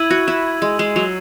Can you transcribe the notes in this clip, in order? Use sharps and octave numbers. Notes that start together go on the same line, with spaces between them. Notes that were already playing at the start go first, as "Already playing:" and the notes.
Already playing: E4 E6 G#6 D#7 F#7
F#4
E4
G#3
G#3 E6 C7 E7
F#3